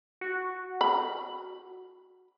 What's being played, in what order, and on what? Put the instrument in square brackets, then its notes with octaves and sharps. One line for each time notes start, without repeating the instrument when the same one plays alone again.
[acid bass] F#4
[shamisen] B5